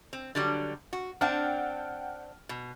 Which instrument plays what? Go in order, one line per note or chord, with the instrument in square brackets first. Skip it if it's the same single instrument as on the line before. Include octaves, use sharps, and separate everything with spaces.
[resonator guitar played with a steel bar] C4
D3 F#3 G3
F#4
[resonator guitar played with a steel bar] C4 D4 [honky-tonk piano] F#5 G5 F6
[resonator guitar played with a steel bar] B2